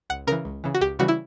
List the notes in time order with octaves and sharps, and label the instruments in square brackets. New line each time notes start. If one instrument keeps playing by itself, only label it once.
[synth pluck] C#2 F#5
C#3 E3 A#4
C#2
C#3 E3
F#4
C#2 G4
C#3 E3 G3 F#4
E4